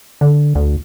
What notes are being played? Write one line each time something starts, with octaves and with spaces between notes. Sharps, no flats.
D3
D2